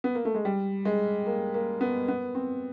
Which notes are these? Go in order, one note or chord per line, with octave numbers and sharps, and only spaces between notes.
B3
A#3
A3
G#3
G3
G#3
A#3
A#3
B3
B3
C4